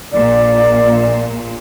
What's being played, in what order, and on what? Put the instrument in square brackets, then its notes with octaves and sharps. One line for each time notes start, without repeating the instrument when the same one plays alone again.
[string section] A#1 A#2 [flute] D5